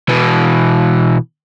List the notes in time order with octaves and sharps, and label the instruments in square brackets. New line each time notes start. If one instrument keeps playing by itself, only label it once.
[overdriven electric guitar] B2 E3